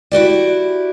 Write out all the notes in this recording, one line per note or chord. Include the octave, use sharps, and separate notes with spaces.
E4 F#4 G4 D5